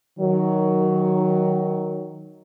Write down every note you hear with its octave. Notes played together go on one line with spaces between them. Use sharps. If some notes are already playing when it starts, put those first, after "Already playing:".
D#3 F#3